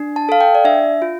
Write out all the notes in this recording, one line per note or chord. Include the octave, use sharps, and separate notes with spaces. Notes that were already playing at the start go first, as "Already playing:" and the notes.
Already playing: D4
A5
A4 F5
G5
D5
D4 E5
F4